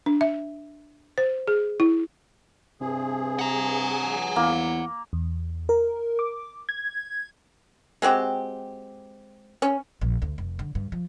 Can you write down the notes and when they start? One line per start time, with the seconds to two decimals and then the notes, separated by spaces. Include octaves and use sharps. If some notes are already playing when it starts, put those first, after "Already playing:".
0.06 D4
0.21 E5
1.18 C5
1.48 G#4
1.80 E4
2.81 G2 C3 G#4
3.39 F#5 A#5
4.36 E2 A#3
5.13 E2
5.69 A#4
6.19 D6
6.69 G#6
8.02 G#3 C4 F#4 G4
9.62 C#4
10.01 A#1
10.22 D2
10.38 F1
10.59 D3
10.75 G2
10.92 F3